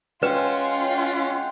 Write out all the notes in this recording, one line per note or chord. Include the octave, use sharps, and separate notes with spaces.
G#3 C#4 F4 B4 F#5 G5